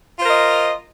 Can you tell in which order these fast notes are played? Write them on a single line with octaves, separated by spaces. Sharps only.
F4 C5 A#4 D#5